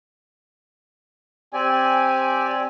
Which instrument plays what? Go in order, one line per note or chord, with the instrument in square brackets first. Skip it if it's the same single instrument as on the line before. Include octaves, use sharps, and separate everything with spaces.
[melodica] C4 [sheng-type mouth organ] G4 D5 [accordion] G#5